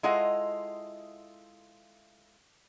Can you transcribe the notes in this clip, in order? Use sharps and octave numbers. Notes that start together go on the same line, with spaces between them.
G#3 E4 F4 A4 D#5 F#5